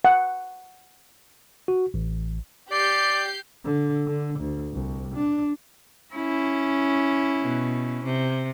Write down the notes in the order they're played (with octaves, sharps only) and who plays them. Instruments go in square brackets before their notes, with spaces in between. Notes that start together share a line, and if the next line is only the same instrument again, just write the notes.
[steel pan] F#5
[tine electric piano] F#4
A1
[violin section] G4 G6 C7 [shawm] D5
[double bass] D3
D3
D2
C2
D4
[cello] C#4 E4
[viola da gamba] B2
C3